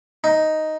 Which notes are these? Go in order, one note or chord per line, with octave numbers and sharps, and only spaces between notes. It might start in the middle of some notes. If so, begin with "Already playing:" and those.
D#4